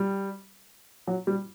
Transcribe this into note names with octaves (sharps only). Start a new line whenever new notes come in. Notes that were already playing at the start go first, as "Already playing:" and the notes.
Already playing: G3
F#3
G3